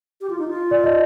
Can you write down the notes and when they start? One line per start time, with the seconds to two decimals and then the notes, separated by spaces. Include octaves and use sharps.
0.21 G4
0.30 F4
0.39 D#4
0.48 F4
0.71 D5
0.84 D#5